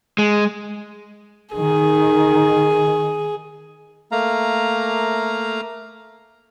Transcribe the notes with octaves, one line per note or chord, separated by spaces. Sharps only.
G#3
D#3 G#4
A3 A#3 F5 A#5